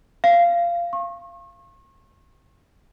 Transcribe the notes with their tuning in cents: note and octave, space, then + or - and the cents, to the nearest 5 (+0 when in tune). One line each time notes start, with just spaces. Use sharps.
F5 -15
C#6 -40